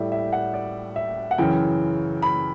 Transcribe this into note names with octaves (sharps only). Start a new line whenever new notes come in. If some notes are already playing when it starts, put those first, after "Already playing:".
Already playing: A2 G3 E5 G5
E5
F#5
D5
E5
F#5
F#2 C#3 E3 G5
B5